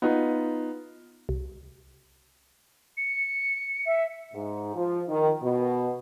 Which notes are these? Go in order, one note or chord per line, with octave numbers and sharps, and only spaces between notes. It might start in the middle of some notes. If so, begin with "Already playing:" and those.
B3 D#4 F4
C2
C#7
E5
G#2
F3
D#3
B2